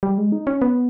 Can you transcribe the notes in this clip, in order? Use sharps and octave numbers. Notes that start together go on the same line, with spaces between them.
G3
G#3
D#4
C#4
B3